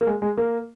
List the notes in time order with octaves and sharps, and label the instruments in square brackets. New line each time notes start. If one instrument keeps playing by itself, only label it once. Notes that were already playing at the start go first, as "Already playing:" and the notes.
[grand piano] A#3
G#3
G#3
A#3